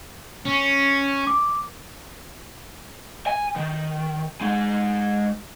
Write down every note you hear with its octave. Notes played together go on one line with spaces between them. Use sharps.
C#4
D6
G#5
D#3
G#3 D#4